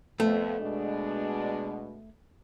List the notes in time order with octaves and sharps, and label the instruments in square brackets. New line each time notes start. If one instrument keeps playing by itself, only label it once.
[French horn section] F2 B3 [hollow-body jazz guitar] A3
[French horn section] B2 G#3 D4